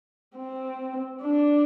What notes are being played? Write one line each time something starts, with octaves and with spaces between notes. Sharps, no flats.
C4
D4